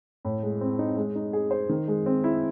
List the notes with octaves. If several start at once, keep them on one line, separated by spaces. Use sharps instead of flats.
A2
G#3
C4
D#4
G#3
D#4
G#4
C5
D#3
G#3
C4
E4